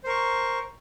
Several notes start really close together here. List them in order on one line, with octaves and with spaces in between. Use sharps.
C5 A#4 C#6